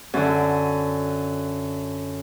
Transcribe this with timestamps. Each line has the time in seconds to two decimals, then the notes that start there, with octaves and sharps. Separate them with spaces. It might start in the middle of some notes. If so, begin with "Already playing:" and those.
0.14 F#2 D3